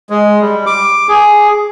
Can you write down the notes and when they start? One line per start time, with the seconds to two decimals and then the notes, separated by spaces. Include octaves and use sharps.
0.10 G#3
0.41 G3
0.66 D6
1.08 G#4